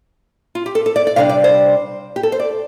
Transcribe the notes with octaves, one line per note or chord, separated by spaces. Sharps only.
F4
G4
A4
A4
D5
D5
C3 G3 D4 F5
D5
C5
G4
A4
C5
D5